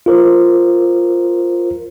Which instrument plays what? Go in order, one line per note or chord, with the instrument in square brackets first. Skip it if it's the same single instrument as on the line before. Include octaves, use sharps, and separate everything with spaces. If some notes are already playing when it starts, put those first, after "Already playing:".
[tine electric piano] F4 A#4 C5